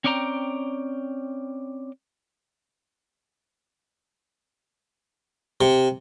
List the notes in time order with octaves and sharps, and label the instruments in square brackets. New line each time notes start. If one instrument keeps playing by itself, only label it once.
[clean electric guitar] C4 C#4 D5 G5 A#5
[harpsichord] C3